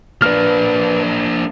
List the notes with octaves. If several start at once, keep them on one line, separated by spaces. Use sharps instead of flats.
A#3 D4 B4 F6